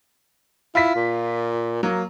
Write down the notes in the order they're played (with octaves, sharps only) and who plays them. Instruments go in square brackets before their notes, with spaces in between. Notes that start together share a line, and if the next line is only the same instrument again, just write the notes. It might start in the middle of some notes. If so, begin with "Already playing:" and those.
[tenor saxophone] E4 [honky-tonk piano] F4 B6
[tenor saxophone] A#2
[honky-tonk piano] F#3 [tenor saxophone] A#3